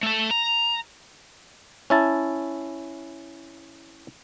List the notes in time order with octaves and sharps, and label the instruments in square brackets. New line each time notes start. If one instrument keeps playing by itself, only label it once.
[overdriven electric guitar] A3 A4
A#5
[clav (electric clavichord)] C#4 E4 A5